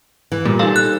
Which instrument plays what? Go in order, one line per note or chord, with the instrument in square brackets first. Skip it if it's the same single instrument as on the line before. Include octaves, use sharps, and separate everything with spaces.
[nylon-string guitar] E3
[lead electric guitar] A#2 [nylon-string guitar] G3
[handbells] D#4 F5 [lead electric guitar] A4 C5
[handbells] F#6